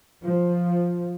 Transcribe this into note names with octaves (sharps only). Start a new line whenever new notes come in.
F3